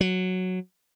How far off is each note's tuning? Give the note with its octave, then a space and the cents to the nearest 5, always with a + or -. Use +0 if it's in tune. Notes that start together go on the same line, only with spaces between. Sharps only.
F#3 -5